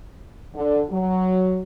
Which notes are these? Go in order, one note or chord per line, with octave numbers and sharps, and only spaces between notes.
D3
F#3